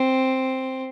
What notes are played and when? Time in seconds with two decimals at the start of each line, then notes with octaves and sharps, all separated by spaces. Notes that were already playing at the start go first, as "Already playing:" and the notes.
Already playing: C4